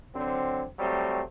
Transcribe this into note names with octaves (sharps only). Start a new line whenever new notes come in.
D3 F#3 C4
F#3 G3 A3 C4